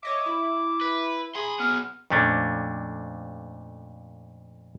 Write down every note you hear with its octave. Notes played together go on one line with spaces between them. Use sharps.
C#5 D#5 E5 D6
E4
B4
G#4 B5 C6
F#3 B3 F6
F2 A#2 A3 C#4 D4